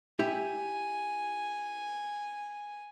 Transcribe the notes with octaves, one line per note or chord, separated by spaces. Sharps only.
E4 G4 E5 G#5